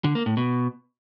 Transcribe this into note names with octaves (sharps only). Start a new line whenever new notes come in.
D3
A#3
A2
B2